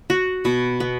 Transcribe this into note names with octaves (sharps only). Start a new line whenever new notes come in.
F#4
B2
B3